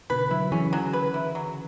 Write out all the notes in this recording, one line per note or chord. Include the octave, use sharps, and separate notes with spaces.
B2 D3 B4
D3 F#3 E4
C#3 E3 C#4
F#3
B4
E4
F#3